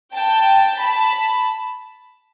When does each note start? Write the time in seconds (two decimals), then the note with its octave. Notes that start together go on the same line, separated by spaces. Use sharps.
0.14 G5 A5
0.80 A5 B5